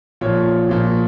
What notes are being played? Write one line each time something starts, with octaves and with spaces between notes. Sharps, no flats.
A#2 F3 C#5
A#2 F3